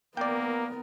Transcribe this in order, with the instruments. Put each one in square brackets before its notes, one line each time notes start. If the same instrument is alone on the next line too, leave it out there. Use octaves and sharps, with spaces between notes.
[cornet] A#3 [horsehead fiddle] B3 A#4 [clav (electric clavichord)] D5 G5